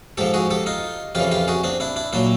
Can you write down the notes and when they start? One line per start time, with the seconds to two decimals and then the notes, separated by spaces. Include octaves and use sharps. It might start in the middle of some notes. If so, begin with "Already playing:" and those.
0.17 G#2 F3 G4 A4
0.34 F#4 G#4
0.50 G4 A4
0.66 D#4 F4
1.15 F2 C#3 E3 F4 G4
1.32 F4 G4
1.48 F#4 G#4
1.64 C4 D4
1.80 D4 E4
1.96 D4 E4
2.13 A#2 F#3 D4 E4